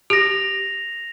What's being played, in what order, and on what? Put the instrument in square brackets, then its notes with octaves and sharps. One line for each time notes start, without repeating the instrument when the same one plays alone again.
[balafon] G4 [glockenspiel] A#6 F7